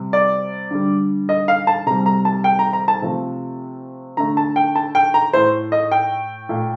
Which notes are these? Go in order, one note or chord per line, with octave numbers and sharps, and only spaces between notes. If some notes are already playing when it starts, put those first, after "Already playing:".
Already playing: C3 G3
D5
D3 G3
D#5
F5
A5
C3 G3 A#5
A#5
A5
G5
A#5
A#5
A5
C3 F3 A3
D3 A3 A#5
A5
G5
A5
G5
A#5
A2 A3 C5
D#5
G5
A#2 A3